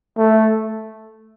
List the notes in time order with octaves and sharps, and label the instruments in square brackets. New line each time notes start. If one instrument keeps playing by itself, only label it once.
[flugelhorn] A3